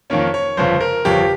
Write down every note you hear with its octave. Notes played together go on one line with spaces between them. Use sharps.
F2 D#3 A#3 C#4 C#5
C#5
G1 F2 C#3 C5
A#4
G1 F2 C#3 G4